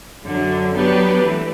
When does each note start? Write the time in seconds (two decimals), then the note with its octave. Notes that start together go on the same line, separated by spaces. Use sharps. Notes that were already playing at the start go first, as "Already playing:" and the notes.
0.24 F#2 D3 F#3
0.73 F#3 B3 D4 G4 B4
1.23 E3 A3